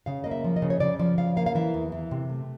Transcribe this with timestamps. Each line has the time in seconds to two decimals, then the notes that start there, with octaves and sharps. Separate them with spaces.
0.06 C#3 F5
0.24 A#3 D#5
0.31 E5
0.44 F3
0.56 D#5
0.62 C#3
0.70 C#5
0.80 C#3 D5
0.99 F3 D5
1.18 C#3 F5
1.36 A#3 F5
1.46 F5
1.55 E3 E5
1.74 E2
1.92 E3
2.11 C3
2.30 A3